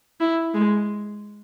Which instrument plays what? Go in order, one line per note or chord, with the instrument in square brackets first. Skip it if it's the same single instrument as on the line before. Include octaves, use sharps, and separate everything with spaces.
[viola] E4
G#3